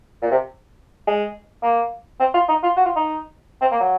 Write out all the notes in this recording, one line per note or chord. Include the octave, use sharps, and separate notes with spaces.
A#2
C3
G#3
A#3
C4
F4
D#4
F4
F#4
F4
D#4
C4
A#3
F#3